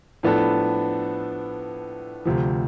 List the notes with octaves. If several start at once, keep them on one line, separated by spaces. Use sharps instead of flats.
A2 F3 B3 D4 A4
D2 C3 F3